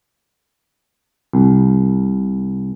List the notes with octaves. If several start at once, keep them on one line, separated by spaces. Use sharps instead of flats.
C2